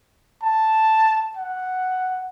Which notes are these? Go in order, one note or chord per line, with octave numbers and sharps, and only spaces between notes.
A5
F#5